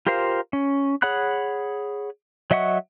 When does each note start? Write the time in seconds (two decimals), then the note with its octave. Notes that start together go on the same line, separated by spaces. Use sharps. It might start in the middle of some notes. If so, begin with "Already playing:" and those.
0.07 F4 G4 A#4 C5 F5
0.53 C#4
1.02 G#4 C#5 F#5 B5 F#6
2.51 F#3 D#5 E5 F#5 C#6